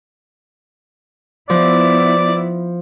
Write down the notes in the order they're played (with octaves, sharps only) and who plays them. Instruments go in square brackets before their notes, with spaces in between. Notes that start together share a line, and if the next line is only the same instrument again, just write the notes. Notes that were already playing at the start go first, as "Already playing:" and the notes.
[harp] F3 [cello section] B3 E4 [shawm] D5